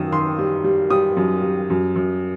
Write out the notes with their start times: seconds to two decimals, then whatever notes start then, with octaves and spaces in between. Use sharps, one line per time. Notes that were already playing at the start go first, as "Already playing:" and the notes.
Already playing: F#2 D#3 D#6 E6
0.12 D#3 C6
0.38 G3
0.64 G3
0.90 G3 D#6
1.17 F#2
1.43 G3
1.70 F#2
1.96 F#2